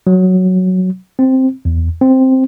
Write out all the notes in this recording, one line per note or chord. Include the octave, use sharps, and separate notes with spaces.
F#3
C4
E2
C4